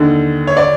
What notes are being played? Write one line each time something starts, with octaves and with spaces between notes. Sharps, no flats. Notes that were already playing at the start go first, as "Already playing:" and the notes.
Already playing: D#2 D3
C#5
D5